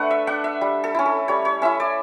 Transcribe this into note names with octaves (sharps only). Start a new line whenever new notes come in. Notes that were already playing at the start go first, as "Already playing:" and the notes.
Already playing: A3 D4 A4 B4 F#5
E5
D4 F#5
E5
G3
A4
C#4 E4
A4
G3 C#5
C#5
C#4 E4 E5
D5